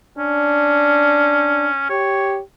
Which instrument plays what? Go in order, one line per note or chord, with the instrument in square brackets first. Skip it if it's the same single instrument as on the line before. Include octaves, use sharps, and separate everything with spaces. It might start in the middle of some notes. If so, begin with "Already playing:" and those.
[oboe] C#4 [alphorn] D4
[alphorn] G4 [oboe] C#5